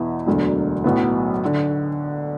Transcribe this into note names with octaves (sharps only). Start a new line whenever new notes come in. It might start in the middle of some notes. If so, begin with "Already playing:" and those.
Already playing: E2 B2 B3 E4
E1 D2 D3 F#3
B1 A2 F#3 B3
D3